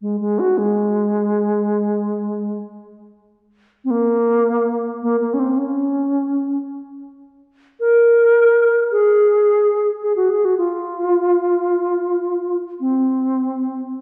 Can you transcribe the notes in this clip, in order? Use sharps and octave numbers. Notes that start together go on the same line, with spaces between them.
G#3
G#3
F#4
G#3
C4
A#3
A#3
A#3
C#4
C4
C#4
A#4
G#4
G#4
F#4
G#4
F#4
F4
C4